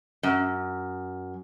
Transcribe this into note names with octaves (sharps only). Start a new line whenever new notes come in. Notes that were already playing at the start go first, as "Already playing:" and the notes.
F#2